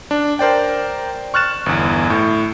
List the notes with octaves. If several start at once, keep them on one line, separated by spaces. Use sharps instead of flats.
D4
A#4 C5 D5 G5
C#6 F6 F#6 A6 E7
G1 E2
A2